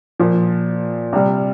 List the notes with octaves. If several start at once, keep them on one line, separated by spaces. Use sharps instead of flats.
A#2 F3
C3 G3